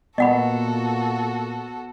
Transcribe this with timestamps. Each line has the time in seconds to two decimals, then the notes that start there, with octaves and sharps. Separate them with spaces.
0.18 A#2 B3 F#4 A4 D#5 F#5 B5